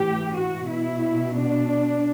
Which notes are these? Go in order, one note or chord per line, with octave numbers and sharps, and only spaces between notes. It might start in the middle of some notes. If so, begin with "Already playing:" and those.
Already playing: A2 E3 G4
F#4
B2 E4
D4